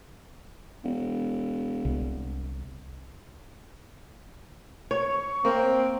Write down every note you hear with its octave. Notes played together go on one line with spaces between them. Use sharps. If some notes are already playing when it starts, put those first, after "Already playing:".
E1
C2
C#5
C#6
A#3 C4 G5